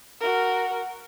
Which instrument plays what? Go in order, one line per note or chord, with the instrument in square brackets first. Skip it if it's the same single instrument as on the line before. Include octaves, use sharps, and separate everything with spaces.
[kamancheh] F#4 A#4